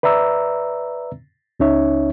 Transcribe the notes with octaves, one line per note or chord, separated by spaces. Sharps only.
B4 D5 E5 A#5 E6
C#2 C#4 D#4 C#5 E5